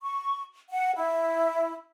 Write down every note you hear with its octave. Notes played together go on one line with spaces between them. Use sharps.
C#6
F#5
E4